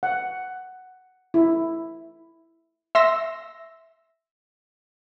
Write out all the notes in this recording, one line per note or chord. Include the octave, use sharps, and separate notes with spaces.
F#5
E4
E5 C6 E6 A#6